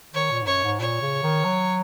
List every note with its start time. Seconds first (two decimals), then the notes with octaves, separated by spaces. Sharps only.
0.14 D#3 C#5
0.31 A#2
0.42 G#2
0.46 F#2 C#5
0.63 G#2
0.80 A#2 C#5
1.02 C#3
1.23 D#3
1.44 F#3